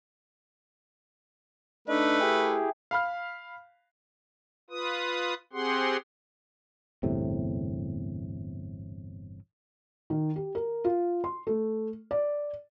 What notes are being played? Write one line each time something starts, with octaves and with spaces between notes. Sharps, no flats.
A3 D4 D#4 B4
E4 G4 G#4
F5 B5 F6
F4 B4 D#6
C4 G4 G#4 F#5 C6
G1 E2 A2 C3
D#3
G4
A#4
F4
C6
A3
D5